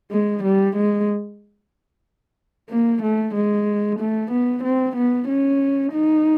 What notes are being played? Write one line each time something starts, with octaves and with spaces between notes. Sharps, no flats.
G#3
G3
G#3
A#3
A3
G#3
A3
B3
C4
B3
C#4
D#4